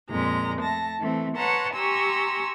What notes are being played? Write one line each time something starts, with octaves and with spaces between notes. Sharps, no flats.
F2 A#2 G#3 A#5
A3 A5 A#6
E3 A3 C4
B4 C#5 F#5 A5 A#5 C6
G4 G#5 A#5 C6 C#6 E6